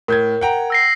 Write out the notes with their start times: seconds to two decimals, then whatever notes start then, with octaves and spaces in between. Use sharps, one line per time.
0.08 A2 A#4 G6 G#6
0.41 F#5 G5 A#5
0.70 E6 A#6 C7